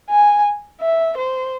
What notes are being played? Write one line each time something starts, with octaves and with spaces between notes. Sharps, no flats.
G#5
E5
C5